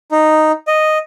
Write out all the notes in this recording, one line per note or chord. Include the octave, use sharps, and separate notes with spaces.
D#4
D#5